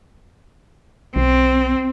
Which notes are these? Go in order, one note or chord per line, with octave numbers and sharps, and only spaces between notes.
B1 C4